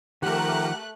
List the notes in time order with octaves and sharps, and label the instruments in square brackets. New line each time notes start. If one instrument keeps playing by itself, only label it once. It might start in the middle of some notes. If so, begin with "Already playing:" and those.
[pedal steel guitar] D#3 F3 [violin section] A3 F#6 [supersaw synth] G4 A#4 [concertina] F#5